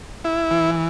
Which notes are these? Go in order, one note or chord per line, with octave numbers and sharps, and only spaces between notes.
E4
E3